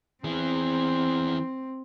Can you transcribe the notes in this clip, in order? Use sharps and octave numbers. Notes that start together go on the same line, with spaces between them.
E3 C4 G#4